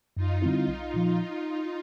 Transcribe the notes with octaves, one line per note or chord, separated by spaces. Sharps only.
F#2 D#4 F4
D3 G3 C4 E4
B1
A#2 F3